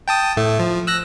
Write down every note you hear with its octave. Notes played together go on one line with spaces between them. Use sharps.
G5 A5 D#6
A2 A3
F3
E6 F#6 A#6